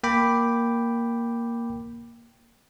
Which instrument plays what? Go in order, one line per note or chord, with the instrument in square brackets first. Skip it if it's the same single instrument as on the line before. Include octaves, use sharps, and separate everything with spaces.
[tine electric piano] A#3 G5 B5 D6